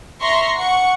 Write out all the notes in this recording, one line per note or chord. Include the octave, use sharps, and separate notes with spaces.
E5 A#5 C6 C#6 A#6
F#5 C#6